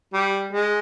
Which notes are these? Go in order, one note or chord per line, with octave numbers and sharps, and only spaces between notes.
G3
G#3